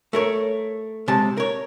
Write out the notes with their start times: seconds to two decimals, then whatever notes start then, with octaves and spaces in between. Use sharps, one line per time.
0.13 A3 A#4 C#5
1.08 C3 G#3 A5
1.37 A#4 C#5